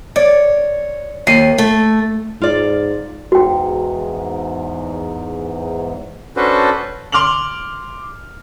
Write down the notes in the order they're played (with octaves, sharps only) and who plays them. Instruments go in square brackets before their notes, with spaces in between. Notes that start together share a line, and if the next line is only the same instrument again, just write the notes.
[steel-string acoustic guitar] C#5 [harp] D5
[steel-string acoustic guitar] D#2 [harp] C7 D#7
[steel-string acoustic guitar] A3
[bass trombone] G#2 [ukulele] F4 D5
[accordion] E2 G#2 [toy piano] F#4 G5
[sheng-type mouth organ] C#4 D4 F#4 A4 B4 C5
[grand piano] C6 D6 F6 F7 F#7